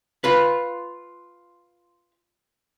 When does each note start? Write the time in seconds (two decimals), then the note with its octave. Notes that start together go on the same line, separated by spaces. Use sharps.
0.24 F4 B4